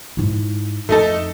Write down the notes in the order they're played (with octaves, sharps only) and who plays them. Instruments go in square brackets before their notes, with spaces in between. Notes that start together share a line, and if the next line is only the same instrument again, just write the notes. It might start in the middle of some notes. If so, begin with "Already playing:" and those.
[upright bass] G#2 E4
[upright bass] F2 [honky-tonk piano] A3 D#4 A4